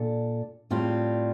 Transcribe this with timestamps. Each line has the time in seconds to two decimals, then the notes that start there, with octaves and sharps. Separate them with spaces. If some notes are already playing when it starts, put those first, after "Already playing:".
Already playing: A#2 D4 A4
0.70 A2 G3 C4 F4